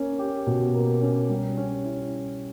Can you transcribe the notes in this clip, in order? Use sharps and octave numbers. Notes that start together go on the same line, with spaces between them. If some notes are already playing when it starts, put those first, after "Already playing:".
Already playing: A#3 C#4
G4
B2
A#3
C#4
G3
C#4
E4